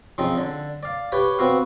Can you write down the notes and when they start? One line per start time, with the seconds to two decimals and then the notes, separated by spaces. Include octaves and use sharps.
0.18 C#3 F3 C4 D#4
0.37 D3
0.83 D5 F5
1.12 G4 B4 C#5 G5
1.39 B3 C4 F#4 F5